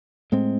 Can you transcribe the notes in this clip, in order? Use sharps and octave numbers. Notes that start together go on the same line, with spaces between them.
A2 G#3 C4